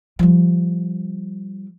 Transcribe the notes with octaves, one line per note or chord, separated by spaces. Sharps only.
F3 G3